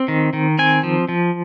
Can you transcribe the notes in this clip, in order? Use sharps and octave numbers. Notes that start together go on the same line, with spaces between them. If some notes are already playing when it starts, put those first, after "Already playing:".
Already playing: C4
D#3
D#3
C4 G#5
F3
F3